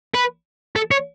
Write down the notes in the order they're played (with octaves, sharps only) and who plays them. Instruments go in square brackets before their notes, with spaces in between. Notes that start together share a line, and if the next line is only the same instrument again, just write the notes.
[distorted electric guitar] B4
A4
C#5